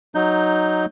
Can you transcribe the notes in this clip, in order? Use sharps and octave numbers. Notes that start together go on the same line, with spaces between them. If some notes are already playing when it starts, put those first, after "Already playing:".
F#3 D#4 G6